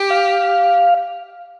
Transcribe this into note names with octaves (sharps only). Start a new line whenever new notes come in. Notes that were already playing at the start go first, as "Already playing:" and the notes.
Already playing: G4
F5